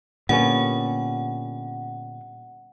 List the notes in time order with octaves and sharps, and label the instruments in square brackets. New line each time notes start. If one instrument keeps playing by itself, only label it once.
[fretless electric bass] A#2 D3 A#3 [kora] G3 B3 C#4 [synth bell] F#5